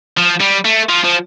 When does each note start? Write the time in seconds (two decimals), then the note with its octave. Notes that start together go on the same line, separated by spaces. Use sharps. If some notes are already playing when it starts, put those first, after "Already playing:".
0.17 F3
0.41 G3
0.65 A3
0.89 F3
1.04 F3